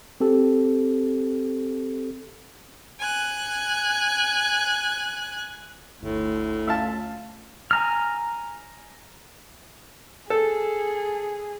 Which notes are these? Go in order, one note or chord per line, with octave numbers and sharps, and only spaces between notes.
C4 G4 A4
G#5 F#6
G1 D2 A2
A3 C#4 F4 E5 F5 A5
G#5 A#5 F6
G#4 A4